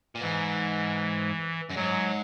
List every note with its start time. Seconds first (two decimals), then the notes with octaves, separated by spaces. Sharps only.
0.15 A#2
0.21 G#2 E3
1.70 F#2
1.76 G#2 F#3